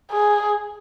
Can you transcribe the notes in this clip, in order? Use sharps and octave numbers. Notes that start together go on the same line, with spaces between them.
G#4